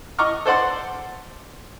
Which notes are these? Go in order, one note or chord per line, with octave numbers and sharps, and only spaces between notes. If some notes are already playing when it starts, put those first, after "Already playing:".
D#5 A#5 C#6 D6 F6
A4 C5 D5 F#5 C6